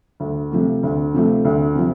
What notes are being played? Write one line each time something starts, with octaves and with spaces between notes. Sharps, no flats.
D2
C3 F3 A3
D2
C3 F3 A3
D2
C3 F3